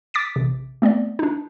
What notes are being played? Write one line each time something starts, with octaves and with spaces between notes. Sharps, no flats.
D6 A6 B6 D7
A1 C3
A3 B3 C4 D5
D4 D#4